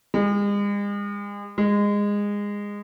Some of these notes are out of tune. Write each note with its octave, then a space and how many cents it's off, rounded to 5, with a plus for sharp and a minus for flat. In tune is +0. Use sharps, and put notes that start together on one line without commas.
G#3 -40
G#3 -20